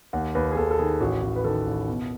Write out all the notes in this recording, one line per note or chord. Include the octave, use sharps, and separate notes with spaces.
D#2 F#5
D#2 B4
G#4
D#2 A4
A4
D#3 G#4
A1 F#4
A1
B4
D#3 A4
A1
B2